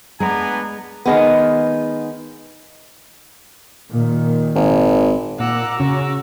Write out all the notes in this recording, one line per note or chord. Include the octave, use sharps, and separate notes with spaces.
G#3 B3 D4 G#5 A#5
D#3 G#3 B3
A#2 D#3
G#1
A#2 F#5 A#5 D6 E6
C#3 C#4 F#4